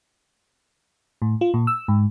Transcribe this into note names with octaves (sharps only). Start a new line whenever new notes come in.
A2
F4
A#2
E6
G#2